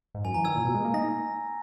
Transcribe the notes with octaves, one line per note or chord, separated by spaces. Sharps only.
G#2
F#2 G#5
E3 A#5
D#3 E6 G#6
A#2
B2
G#3
A#3
D#4 A#6